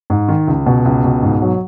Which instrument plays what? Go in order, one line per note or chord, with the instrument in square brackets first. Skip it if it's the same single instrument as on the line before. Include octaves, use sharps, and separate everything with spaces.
[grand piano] G#2
D#3
C#2
B2
C#2
B2
G#2
F#3